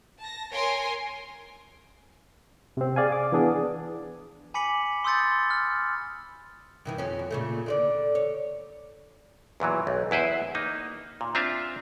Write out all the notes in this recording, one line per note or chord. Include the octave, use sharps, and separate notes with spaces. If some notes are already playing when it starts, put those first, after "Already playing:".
A5 A#6
A#4 C#5 G#5 C6 A#6 D7
C3 C4
G#4 D5 F5 G#5
D6
E3 B3 D4 G#4 D5
G#5 B5 D6 B6 C#7 F#7
C6 D#6 E6 G6 A6 C#7
F6
G2 D#3 E3
F2 C#4
F#2
A#2 C#3 A3
D3 F4 D5
C#5
E2 A#2 E3 F#3
B1
E2 E4 B4 C5 E5
A#3 D#4
A#2
C4 D4 F4 E5 F5